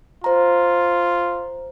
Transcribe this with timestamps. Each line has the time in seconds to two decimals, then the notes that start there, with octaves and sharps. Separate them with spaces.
0.24 F4 C5 A#5